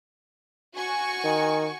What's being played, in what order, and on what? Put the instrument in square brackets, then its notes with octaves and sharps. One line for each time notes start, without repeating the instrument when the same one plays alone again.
[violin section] F#4 G#5 C#6
[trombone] D#3